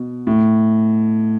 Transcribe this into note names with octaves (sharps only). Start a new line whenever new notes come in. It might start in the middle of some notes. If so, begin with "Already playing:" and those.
Already playing: B2
A2